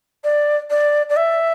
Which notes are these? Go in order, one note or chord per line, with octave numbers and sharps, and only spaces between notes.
D5
D5
D5
E5